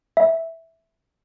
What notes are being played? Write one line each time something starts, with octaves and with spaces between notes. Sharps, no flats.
E5